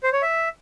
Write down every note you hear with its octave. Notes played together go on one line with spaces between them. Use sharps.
C5
C#5
E5